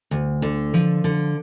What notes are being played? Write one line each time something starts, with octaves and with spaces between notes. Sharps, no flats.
D2
D3
F3
D3